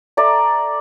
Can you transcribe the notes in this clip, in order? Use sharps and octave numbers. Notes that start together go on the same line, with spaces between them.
A4 D5 E5 A#5